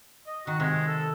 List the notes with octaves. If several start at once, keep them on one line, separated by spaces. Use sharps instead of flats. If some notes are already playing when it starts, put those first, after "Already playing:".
D#5
D#3 F#4
C3 G#3
A4